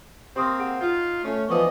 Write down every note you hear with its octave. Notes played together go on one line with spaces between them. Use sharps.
A#3 C4 G4 C6 D#6
G#4 F#5 D7
D#4 F4 G6
A3 C#4
E3 F3 B3 D5 D#5 C#6